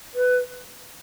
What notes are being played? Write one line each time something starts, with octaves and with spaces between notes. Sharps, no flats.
B4